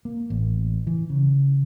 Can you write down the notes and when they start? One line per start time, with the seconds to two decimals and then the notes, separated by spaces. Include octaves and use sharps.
0.05 A#3
0.30 A1
0.87 E3
1.10 C#3